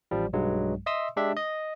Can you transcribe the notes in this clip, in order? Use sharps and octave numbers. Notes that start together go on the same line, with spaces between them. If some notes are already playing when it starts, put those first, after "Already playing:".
A1 F3 G3
B1 G2 F#3 G#3
D#5 E5 C6 D#6 E6
G#3 D4 G4 E5
D#5